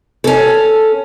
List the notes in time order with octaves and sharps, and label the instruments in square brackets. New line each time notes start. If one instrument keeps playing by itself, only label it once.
[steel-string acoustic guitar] C#4 A4